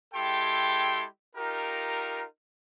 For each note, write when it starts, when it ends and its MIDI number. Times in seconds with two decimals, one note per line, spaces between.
0.14 1.05 56
0.14 1.05 64
0.14 1.05 67
0.14 1.05 69
0.14 1.05 79
0.14 1.05 84
1.36 2.25 63
1.36 2.25 65
1.36 2.25 67
1.36 2.25 70